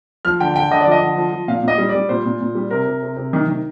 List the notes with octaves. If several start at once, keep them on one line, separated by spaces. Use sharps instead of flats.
F3 F6
D3 G5
D3 G5
D3 D#5
F3 D5
D#5
D3
F3
F3
A#2 F5
A#2
D#5
G3
D5
G3
A#2 C5
A#2
A#2
G3
C3 A#4
C3
C3
C3
D#3
D#3